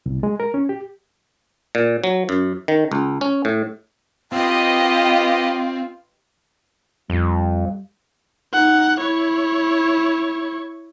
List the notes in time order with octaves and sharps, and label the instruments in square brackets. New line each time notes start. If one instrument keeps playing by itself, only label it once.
[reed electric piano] C2
G#3
A#4
C#4
G4
[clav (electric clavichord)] A#2
F#3
F#2
D#3
C#2
C#4
A2
[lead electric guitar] C4 [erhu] F4 [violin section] G4 B4 D#5 [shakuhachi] G5
[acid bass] F2 [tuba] G3
[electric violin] D#4 F#5
E4 C#5